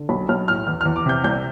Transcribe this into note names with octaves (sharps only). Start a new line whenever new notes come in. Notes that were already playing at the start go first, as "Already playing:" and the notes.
Already playing: D3
B1 B5
B1 F6
A2 F6
E2 F6
E2 F6
D6
C3 G6
C2 G6